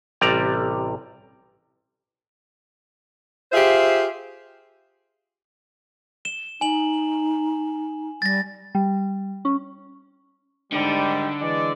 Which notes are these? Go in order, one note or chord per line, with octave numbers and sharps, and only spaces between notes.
A1 C3 G3 D5 A#5
F4 G4 G#4 C5 E5
E7 G7
D#4 G#5 F#7
G3 A6 A#6
G3
C#4
G#2 D3 D#3 G3
E3 G#3 D5